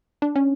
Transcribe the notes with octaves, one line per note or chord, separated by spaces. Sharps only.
D4
C#4